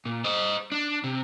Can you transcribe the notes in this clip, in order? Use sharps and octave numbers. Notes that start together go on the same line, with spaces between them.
A#2
C5 D#5
D4
C3